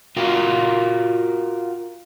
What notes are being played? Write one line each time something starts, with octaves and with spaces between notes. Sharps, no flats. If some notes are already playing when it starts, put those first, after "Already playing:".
F4 F#4 A#4 F5 G5